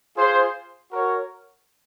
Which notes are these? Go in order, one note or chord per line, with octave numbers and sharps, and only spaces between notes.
F4 G#4 C5
F#4 A#4 C#5